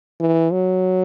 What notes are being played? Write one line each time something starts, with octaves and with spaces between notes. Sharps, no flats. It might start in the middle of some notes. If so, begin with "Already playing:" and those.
E3
F#3